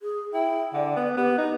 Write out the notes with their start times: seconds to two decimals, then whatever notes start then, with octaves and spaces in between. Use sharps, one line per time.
0.01 G#4
0.34 E4 G5
0.73 D3 D5
0.96 B3
1.17 B3 G4
1.38 D#4 B4